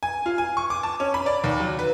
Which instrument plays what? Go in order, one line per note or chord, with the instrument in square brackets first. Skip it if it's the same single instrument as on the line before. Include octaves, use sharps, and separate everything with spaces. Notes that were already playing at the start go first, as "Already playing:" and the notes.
[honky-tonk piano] G#5
F4
G#5
C#6
D6
A5
C#4
B5
D5
D#2
F#3
B4